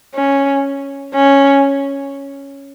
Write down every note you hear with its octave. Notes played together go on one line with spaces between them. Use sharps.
C#4
C#4